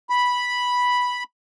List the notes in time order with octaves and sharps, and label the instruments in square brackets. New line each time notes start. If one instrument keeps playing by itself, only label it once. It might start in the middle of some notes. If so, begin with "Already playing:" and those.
[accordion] B5